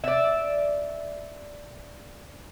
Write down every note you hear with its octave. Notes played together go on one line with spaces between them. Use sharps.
D5 E5